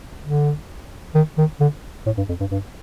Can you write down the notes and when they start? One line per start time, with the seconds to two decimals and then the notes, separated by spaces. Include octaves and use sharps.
0.24 D3
1.15 D#3
1.38 D#3
1.60 D3
2.06 A2
2.17 G2
2.29 F2
2.40 G2
2.51 G2